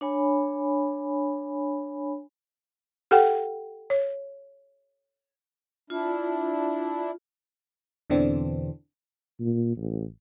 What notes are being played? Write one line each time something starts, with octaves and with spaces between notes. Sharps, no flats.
D4 C#5 G#5 B5
G4 A4 F#5 G5
C#5
D4 E4 F4
E2 B2 D3 E3 C4 D4
A#2
A1